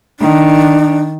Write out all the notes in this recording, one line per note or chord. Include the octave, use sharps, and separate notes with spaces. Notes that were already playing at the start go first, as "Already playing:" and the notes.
D#3 D4